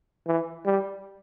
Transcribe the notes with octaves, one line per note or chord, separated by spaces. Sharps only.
E3
G3